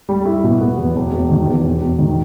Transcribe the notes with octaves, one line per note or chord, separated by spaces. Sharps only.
G3
E4
B2
B3
E2
E1
E1
D#3
E2
E1
E1
D#3